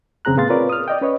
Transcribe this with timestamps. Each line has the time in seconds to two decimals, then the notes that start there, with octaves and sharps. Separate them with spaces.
0.25 F2 C#3 C4 G#4 A#5 F#6
0.37 A2 B3 G#4 F5 C6 A6
0.49 C4 F4 A#4 B4 C#5 D5
0.69 D#6 F6
0.88 D5 D#5 G5
1.01 C#4 B4 C#5 D#5